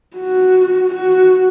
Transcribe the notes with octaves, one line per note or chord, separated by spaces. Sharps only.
F#4
F#4